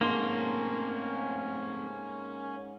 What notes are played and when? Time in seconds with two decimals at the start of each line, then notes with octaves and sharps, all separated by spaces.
0.01 G#2 A3 A#3 C4 C#4 C6 G7